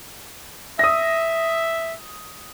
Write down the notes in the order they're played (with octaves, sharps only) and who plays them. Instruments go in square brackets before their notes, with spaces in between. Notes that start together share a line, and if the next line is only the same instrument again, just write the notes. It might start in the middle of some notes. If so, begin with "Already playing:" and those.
[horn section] E5 [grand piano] D#6 A#6